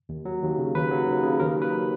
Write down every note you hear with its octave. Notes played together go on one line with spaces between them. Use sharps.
D#2
F#3
D#2
C#3
D#2 B4
F#3
D#2
C#3
D#2 A#4
F#3
B4